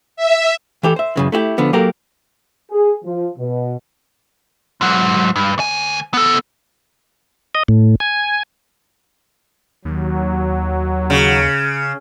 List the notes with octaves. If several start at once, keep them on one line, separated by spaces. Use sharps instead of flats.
E5
E3 G4 A4
C5 E5
F#2 C#3 E3
A3 E4 F#4 G4
D3 F3 B3
F#3 A#3 F#4 G4 A4 A#4
G#4
F3
B2
G#2 F#3
G2
D2 G#5
B3 A4
D#5
A2
G#5
D#2 F#3
C#3